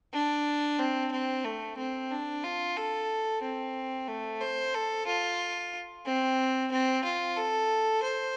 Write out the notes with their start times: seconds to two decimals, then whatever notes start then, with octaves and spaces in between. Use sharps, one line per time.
0.13 D4
0.79 C4
1.12 C4
1.45 A3
1.77 C4
2.11 D4
2.44 F4
2.77 A4
3.42 C4
4.08 A3
4.40 C5
4.74 A4
5.07 F4
6.06 C4
6.71 C4
7.04 F4
7.37 A4
8.03 C5